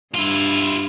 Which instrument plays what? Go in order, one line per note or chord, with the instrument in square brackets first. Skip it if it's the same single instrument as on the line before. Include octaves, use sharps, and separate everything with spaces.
[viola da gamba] G2 [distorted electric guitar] E4 F4